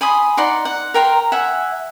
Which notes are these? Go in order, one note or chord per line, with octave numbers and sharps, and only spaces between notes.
G#5 B5 C6 D#6
D#4 D5 F#5 C6
F#5
A#4 G5 A#5 C6
E5 F#5 G#5